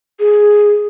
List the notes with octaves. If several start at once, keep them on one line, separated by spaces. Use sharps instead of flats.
G#4